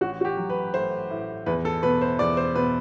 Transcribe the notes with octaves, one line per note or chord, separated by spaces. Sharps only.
A1 F#4
F#4
G4
F#3
B4
A3 C5
A2
E2 B4
A4
B2 B4
C5
E2 D5
C5
B2 B4